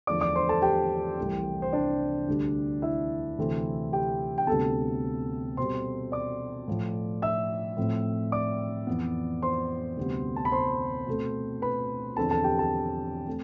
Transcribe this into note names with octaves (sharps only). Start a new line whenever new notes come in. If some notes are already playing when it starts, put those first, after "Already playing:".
E2 D3 F3 A3 D5 D6
D5 D6
C5 C6
A4 A5
G4 G5
C2 C3 E3 A3 C4
C5
D4 D5
D2 D3 G3
E4 E5
D2 C3 E3 A3 C4
G4 G5
G5
D2 C3 G3 B3 A4 A5
B2 G3 C4 C5 C6
D5 D6
A2 F3 A3
E5 E6
A2 F3 C4
D5 D6
F2 E3 B3
C5 C6
D2 C3 G3 B3
A5
B5
C5 C6
B2 A3 C4
B4 B5
E2 D3 F3 C4 A4 A5
A4 A5
G4 G5
A4 A5
A3 C4